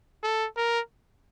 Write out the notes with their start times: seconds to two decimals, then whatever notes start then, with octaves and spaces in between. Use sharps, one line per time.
0.23 A4
0.56 A#4